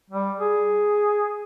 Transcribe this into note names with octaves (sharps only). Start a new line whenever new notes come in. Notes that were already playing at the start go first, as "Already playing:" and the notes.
G3
G#4